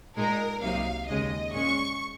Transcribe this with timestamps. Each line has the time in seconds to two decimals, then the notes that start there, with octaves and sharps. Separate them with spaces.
0.15 A#2 G#3 D#4 A#4
0.61 C2 C3 F#3 A#3 D#4 F5
1.07 D#2 C#3 G#3 D#5
1.52 A#2 G#3 C#4 C#6